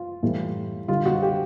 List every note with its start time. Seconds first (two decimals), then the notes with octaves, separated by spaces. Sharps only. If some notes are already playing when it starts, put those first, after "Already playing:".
Already playing: F4
0.23 A2 E3 G3
0.88 D3 G3 F4
1.06 F#4
1.23 G4